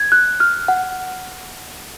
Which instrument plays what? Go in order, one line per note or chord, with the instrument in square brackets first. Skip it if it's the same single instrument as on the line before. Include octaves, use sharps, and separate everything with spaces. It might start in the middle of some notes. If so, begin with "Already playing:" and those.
Already playing: [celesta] G#6
F#6
F6
F#5